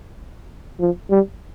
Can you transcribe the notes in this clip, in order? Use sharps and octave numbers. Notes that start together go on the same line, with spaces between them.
F3
G3